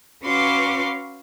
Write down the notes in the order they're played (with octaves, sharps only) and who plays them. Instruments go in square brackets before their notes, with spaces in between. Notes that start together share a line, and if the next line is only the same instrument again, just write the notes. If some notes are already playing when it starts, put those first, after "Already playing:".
[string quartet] C#4 F#4 B4 F5 C6 D6